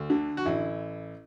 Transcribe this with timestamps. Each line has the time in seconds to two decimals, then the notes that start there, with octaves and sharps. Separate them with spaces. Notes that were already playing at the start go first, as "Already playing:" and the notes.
Already playing: D2
0.10 D3
0.37 F#4
0.46 A1 E4